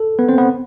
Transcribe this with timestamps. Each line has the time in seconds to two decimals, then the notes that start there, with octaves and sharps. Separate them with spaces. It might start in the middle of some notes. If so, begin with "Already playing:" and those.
Already playing: A4
0.19 B3 B4
0.29 C4 C5
0.38 B3 B4